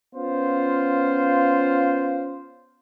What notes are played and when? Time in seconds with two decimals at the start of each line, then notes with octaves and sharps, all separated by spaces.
0.14 B3 C#4 F4 C5 F5